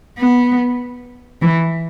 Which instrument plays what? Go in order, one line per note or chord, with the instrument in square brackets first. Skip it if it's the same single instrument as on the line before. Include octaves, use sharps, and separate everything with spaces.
[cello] B3
E3